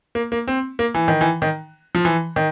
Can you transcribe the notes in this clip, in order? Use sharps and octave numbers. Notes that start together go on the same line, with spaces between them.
A#3
A#3
C4
A#3
E3
D#3
E3
D#3
F3
E3
D#3